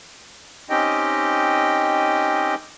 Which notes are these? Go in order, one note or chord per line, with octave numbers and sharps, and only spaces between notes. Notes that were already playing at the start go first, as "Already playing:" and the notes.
C4 C#4 D#4 G4 D#5 G5